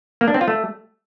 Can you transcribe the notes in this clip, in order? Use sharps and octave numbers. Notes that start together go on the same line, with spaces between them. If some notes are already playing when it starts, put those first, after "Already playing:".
A#3
D4
C4
F4
A3